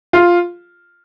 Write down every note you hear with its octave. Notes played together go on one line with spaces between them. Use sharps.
F4